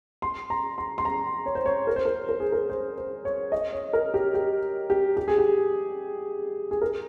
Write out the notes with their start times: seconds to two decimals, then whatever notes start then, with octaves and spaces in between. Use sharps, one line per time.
0.22 C6
0.50 A#5
0.78 C6
0.98 C6
1.05 A#5
1.46 C#5
1.55 C5
1.66 C#5
1.87 A#4
1.96 C5
2.05 A#4
2.29 A#4
2.40 G#4
2.52 A#4
2.70 C5
2.97 C5
3.25 C#5
3.52 D#5
3.73 C#5
3.93 A#4
4.14 G4
4.34 G4
4.90 G4
5.17 G4
5.28 G#4
5.38 G4
6.71 G#4
6.81 A#4